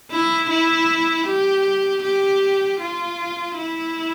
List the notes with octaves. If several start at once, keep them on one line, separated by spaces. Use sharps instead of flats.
E4
E4
G4
G4
F4
E4